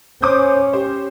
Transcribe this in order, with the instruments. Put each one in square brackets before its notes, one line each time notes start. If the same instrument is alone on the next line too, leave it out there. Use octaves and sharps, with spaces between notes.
[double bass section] C#4 [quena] C5 [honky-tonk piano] D6 D#6 G6
[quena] G4 [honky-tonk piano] C5